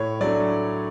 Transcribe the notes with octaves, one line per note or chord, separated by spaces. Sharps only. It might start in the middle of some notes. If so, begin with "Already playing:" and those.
Already playing: A2 C#5
F#3 A3 D4 D5